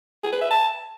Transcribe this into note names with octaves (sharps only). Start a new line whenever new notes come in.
G#4
B4
E5
A5